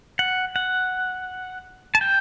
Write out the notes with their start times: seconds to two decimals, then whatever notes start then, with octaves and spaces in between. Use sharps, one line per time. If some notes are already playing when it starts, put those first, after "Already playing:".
0.19 F#5
0.56 F#5
1.95 A5
2.01 G5